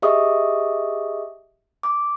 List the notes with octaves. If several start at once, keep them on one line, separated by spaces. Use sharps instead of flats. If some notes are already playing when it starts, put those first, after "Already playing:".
G4 G#4 D#5 E5 C#6 D#6
D6